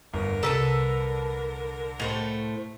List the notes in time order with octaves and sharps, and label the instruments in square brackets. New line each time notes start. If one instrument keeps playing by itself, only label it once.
[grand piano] G1 [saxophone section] D3 D4 A#4 [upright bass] C4
[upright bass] C2 [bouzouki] A4 B4 A5 [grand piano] A#5 E6 B6
[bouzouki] A2 A3 C5 [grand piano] F7